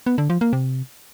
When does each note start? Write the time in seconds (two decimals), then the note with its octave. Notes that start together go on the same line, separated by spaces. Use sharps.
0.06 B3
0.18 D3
0.30 F3
0.41 A#3
0.53 C3